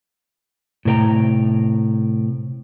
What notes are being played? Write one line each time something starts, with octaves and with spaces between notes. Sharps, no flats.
A2 C3 A#4 G5 A#5